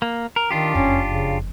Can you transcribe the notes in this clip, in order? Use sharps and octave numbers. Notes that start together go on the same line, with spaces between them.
A#3
A#4
D#3 D4 F4 G4
F#1 F2 C#4
C#3